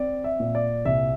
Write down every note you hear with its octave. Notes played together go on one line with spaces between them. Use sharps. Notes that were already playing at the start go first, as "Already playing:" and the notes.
Already playing: C4 D5
E5
A#2
D5
C2 E5